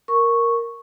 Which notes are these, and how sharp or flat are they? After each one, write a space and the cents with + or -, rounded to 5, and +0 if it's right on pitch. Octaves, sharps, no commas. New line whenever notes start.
A#4 +0 C#6 -5